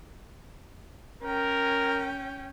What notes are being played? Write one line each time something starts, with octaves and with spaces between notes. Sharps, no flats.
C#4 A#4 G5